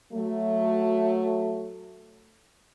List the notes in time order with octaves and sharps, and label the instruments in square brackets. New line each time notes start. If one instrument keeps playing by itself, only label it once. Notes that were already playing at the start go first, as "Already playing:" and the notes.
[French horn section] F#3 A3